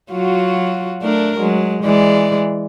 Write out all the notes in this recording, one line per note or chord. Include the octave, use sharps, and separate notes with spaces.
F#3 F4 F#4
A3 D4 A#4
F#3 G#3
E3 G#3 D5